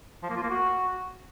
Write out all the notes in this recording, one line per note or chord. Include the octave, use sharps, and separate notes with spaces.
F3
A#3
F4
A#3
F#4